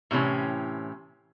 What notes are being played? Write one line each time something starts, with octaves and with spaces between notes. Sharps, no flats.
A2 C3 E3 C#4